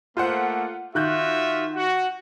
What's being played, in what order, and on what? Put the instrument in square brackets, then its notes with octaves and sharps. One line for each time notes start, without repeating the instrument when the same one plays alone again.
[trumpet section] A3 A#3 [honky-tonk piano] F4 C5 F#5
[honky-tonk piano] D#3 F#6 G6 [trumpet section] F4 F#4 E5
[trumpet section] F#4